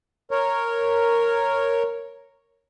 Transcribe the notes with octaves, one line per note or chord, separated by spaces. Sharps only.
A#4 C#5